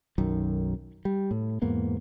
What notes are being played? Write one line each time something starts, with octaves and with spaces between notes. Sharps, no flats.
B1 F#2 D#3
G3
A2
E2 G#2 A#3 B3